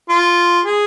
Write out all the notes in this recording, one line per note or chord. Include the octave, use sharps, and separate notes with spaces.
F4
G#4